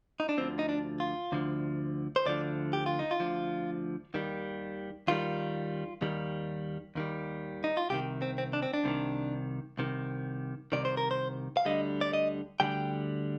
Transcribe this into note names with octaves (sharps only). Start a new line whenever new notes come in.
D#4
D4
D2 D3 F3 C4
D#4
D4
F4
D2 D3 F3
C5
D2 D3 F3 D5
G4
F4
D#4
F4
D2 D3 F3
D#2 D#3 G3
D#2 D#3 G3 F4
D#2 D#3 G3
D#2 D#3 G3
D#4
F4
C2 C3 D#3 G4
C4
C4
D4
C4
D4
C2 C3 D#3
C2 C3 D#3
C2 C3 D#3 D5
C5
A#4
C5
F5
D2 D3 G3 D#5
D5
D#5
D2 D3 G3 G5